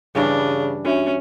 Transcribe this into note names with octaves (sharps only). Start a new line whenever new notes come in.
G2 C#3 E3 G3 D4
C#4 D4 F#4 E5